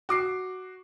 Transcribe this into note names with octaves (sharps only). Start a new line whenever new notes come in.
F#4 D6 C7